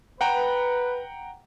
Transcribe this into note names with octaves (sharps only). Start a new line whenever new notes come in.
B4 F#5 G5 A#5